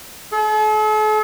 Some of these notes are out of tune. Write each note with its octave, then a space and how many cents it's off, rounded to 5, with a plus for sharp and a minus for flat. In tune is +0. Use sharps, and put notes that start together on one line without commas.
A4 -45